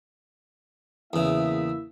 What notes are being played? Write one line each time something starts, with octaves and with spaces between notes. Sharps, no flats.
E2 C#3 A#3 E4 E5